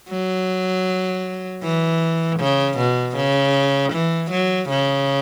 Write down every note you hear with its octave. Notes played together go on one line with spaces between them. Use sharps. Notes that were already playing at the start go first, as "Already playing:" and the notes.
F#3
E3
C#3
B2
C#3
E3
F#3
C#3